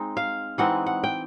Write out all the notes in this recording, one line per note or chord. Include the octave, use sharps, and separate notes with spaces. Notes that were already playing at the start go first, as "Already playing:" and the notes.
Already playing: G#3 C4 D#4
F5
E3 G#3 C4 D#4 F#5
F#5
G5